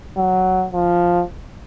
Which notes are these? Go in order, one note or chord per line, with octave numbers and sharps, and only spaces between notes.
F#3
F3